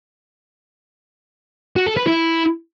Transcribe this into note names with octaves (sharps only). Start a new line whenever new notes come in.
F#4
A4
B4
E4